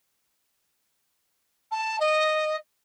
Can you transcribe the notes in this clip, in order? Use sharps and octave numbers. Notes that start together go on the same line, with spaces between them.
A5
D#5